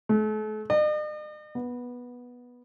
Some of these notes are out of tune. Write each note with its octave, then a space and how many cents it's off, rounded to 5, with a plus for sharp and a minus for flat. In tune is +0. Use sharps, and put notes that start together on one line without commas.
A3 -40
D#5 -45
B3 -10